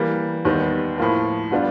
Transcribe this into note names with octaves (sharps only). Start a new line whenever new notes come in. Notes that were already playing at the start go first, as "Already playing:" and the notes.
Already playing: E3 G3 A#3
D#2 D#3 G3 B3
A2 F3 A#3
D3 G3 B3 D4 F4